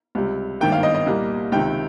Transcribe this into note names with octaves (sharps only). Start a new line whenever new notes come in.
C#2 C3 G3
G#1 G2 D#3 A#3 G5
F5
D#5
D#5
C2 A#2 G3 A#3
C#2 C3 D#3 G5